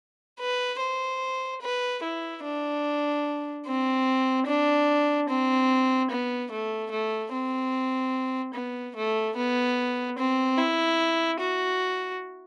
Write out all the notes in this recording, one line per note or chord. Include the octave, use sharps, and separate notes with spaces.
B4
C5
B4
E4
D4
C4
D4
C4
B3
A3
A3
C4
B3
A3
B3
C4
E4
F#4